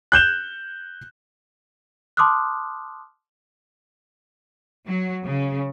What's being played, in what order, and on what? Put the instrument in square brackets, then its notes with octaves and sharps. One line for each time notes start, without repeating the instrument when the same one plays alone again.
[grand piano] F#6 G6 E7 G7
[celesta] A5 C6 D6 D#6 F6 F#6
[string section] F#3
C#3